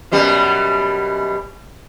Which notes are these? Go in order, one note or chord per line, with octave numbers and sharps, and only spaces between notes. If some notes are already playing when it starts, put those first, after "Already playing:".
F#2 B2 G3